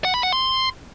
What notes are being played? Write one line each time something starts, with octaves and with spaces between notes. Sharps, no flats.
F#5
B5
F#5
C6